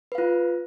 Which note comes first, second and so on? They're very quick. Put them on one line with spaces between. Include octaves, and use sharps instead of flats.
B4 F5 F4